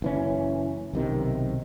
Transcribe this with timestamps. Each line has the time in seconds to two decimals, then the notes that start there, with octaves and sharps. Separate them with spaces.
0.02 F#1 E3 C#4
0.93 B1 C3 D#3